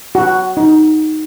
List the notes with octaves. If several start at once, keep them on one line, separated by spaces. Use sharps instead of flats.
F#4
D#4